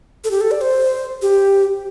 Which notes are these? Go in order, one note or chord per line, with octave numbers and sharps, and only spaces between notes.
A4
G4
A4
D5
C5
G4